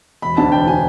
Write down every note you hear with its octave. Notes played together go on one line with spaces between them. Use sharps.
E1 B5
D2 D3 A5
E1 G5
D3 G#5